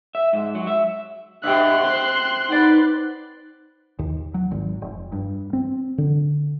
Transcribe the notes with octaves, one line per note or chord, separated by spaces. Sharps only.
E5
G#2
F#3
E5
G2 B2 G4 E5 C6 F#6
C4
D#4 B4 D5 F#5
D#2
F#3
G#1
F1
G2
C4
D3